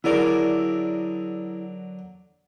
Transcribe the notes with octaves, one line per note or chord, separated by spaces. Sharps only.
D3 F#3 E4 G#4 A#4 D5